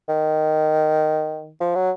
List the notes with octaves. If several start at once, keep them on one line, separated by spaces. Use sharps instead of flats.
D#3
F3
F#3